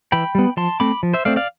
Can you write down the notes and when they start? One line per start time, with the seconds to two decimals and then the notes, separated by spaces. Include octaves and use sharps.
0.12 E3 G5 B5
0.35 G3 B3
0.57 F3 A5 C6
0.80 A3 C4 B5 D6
1.03 F3
1.14 C5 E5
1.25 A3 C4 D5 F5
1.36 D5 F5